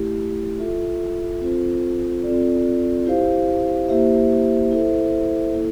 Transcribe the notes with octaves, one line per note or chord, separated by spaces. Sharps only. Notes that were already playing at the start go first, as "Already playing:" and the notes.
Already playing: A3 E4 G4
F4 A4 E5
C4 F4 A4 C5
C4 F4 A4 D5
E4 G4 C5 F5
A#3 E4 G4 C5 E5
E4 A4 C5 E5
A#3 E4 A4